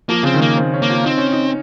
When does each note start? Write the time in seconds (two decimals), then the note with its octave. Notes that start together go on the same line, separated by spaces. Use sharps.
0.09 F3 A#3
0.23 C#3 C4
0.34 D#3
0.42 A#3
0.57 C4
0.74 C#4
0.82 A#3
0.90 F4
1.04 C4 D#4
1.18 C#4
1.32 D#4